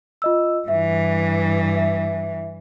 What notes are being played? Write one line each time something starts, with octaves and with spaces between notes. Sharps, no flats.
F4 D#5 E6
G2 E3 E5
E5